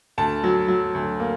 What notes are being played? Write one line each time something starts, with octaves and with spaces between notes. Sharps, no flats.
D2 A5
F#3
F#3
D2
A#3